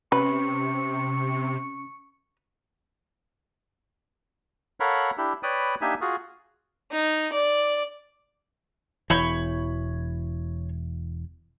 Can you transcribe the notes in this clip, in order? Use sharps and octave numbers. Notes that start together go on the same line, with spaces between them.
C3 C#4 B4 C#6
A4 A#4 C#5 F5 F#5 B5
D4 E4 G4
B4 C#5 D5 G5 B5 D#6
A#3 D4 D#4 G4 E5 G#5
F4 F#4 G#4
D#4
D5
E1 E3 C#5 B5 G6